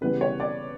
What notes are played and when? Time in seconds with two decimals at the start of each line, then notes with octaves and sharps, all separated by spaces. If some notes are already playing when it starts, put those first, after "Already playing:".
0.01 C#3 E3 G3 B3 B4
0.21 C#5
0.40 D5